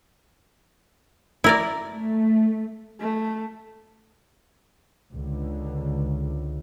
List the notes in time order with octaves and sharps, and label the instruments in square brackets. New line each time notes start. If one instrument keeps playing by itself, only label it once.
[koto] E4 A#4 D5
[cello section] A3
[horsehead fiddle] A3
[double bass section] C#2 D3